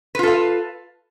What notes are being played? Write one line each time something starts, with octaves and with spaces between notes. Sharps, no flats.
F4 A4 B4 F5